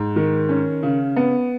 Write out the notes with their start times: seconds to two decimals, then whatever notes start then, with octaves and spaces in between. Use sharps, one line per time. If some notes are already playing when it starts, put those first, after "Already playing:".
Already playing: G#2
0.16 D#3
0.49 C#4
0.83 C#3
1.16 B3